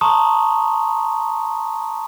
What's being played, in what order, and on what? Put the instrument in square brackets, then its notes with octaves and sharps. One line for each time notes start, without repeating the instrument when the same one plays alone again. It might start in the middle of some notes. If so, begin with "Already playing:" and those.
[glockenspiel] A5 A#5 C6 C#6 D#6